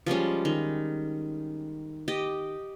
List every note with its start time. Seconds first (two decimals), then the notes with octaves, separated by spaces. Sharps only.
0.06 F3 G3 G#3 C#4
0.45 D#3
2.08 G4 D#5